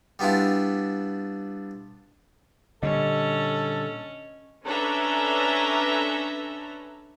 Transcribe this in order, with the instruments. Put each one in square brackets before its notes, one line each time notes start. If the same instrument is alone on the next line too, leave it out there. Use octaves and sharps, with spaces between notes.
[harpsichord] G3 B3 D4 E4 F4
[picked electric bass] A#2 D3 G3 [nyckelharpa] C#4 [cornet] A4 [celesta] D#5
[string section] C#4 D4 A4 B4 E5 A#5